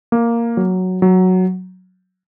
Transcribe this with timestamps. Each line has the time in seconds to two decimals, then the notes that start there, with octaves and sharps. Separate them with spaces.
0.12 A#3
0.57 F#3
1.02 F#3